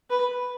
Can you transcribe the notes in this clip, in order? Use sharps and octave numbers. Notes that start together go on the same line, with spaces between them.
B4